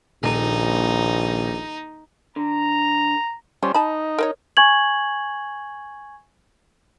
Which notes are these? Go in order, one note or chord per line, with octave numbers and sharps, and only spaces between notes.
D#1 A#1 D#4
D3 A#5
F3 G3 C#4 C5
D#4 A5 B5
A#4 C5 C#5
G#5 C#6 G#6 F#7